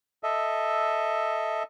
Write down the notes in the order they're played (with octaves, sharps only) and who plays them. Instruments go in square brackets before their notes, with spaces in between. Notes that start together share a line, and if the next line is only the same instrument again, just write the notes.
[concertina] A4 D#5 E5